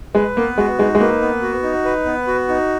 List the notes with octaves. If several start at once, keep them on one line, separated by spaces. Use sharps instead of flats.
G#3 B4
A#3 B3
G#3 F#4
G#3 D#4
G#3
A#3 B4
B3
F#4
D#4
B4
B3
F#4
D#4